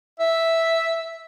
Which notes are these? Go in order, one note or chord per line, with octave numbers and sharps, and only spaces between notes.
E5